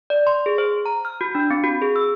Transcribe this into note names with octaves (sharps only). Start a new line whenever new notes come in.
D5
C6
G#4
C5
A#5
F6
F#4
D4
C4
F#4
G#4
E6